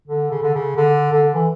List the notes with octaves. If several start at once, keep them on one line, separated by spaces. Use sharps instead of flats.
D3
C#3
D3
C#3
D3
D3
E3